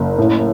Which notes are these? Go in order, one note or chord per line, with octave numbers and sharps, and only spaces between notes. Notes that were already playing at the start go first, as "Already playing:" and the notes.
Already playing: F#1
A2